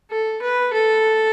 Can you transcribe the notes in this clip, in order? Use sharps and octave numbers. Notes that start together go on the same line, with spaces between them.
A4
B4
A4